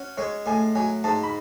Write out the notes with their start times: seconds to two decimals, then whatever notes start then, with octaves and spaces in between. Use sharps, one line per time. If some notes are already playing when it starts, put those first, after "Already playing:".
Already playing: C#4 F#4
0.17 G#3 C#5
0.46 A2 G#5
0.75 F#3 G#5
1.04 G#2 A5
1.23 B5